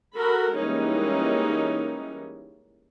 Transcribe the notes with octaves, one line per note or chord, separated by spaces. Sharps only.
F#4 A4 A#4 B5
E3 G3 G#3 A#3 C#4 D#4